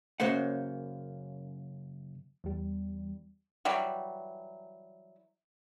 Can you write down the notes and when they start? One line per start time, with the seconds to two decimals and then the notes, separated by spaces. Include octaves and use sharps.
0.20 F#2 C#3 A#3 C5 F#5
2.44 E2 G3
3.65 E3 F#3 G3